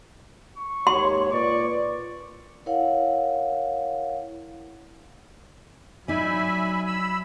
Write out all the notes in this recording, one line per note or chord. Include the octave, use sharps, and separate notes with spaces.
C#6
D#2 G#2 C#5 C6
A#2 B4 D5 C#6
E4 A#4 C#5 F5 F#5
F#3 D#4 D5 E5 G#5 B5
B5 E6